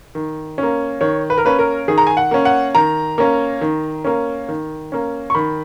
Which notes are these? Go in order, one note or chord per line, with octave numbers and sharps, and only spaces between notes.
D#3
A#3 C#4
D#3 C#5
B4
A#4
A#3 C#4 B4
A#4
D#3 G#4
A#5
G#5
F#5
A#3 C#4
F#5
D#3 A#5
A#3 C#4
D#3
A#3 C#4
D#3
A#3 C#4
C#6
D#3 B5